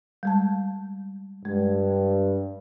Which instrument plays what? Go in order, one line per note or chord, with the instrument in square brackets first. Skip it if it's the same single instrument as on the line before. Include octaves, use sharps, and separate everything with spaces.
[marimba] G3 G#3 A5
[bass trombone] G2 [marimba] G#3